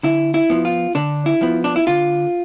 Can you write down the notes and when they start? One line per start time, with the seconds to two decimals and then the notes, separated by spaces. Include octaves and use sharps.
0.03 D3 E4
0.34 E4
0.50 F3 B3
0.65 F4
0.95 D3 D4
1.26 E4
1.41 F3 B3
1.64 D4
1.76 E4
1.87 D3 F4